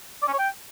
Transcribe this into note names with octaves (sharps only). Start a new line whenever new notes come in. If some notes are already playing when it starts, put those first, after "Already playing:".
D5
C#4
C#5
G5